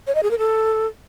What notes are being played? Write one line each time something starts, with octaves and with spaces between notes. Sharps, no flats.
C#5
D#5
G#4
A#4
A4